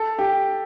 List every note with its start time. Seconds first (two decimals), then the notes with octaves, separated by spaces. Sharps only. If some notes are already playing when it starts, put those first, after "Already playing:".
Already playing: A4
0.19 G4